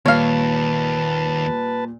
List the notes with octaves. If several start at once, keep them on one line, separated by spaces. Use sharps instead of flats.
D#2 A#2 G3 B4 C#5 F5 A5